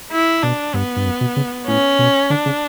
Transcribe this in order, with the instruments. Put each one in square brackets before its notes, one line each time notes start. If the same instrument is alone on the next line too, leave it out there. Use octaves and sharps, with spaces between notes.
[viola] E4
[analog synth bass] B2 [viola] D4
[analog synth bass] G2 [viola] B3
[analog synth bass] G2
F#2
B2
C#3
[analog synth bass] A2 [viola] C#4
[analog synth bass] B2
[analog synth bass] D3 [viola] D4
[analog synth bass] C#3